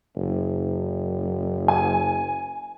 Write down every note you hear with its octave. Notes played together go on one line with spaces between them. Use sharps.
F#1
G#5